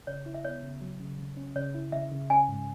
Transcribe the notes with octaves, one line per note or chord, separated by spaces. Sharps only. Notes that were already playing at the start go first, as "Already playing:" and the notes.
C#3 C#5
E4
E5
B3 C#5
C#3
F#3
C#3
C#3
C#4
C#3 C#5
E4
C#3 E5
C#3
C#4 G#5
G#2